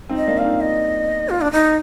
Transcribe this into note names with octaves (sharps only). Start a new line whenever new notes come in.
C4 D#4
D#5
A#3 D4
D4 F5
C4 D#4
D#5
F4
D4
D#4